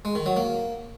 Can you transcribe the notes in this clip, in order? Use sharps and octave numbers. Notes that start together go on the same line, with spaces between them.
G#3
D#3
F#3
A#3